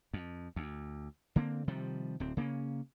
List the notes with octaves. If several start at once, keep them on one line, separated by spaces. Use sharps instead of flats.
F2
D2
D3 A#3 C4
C3 D#3 F3 G3
D1 C4
C#3 A#3 C4 C#4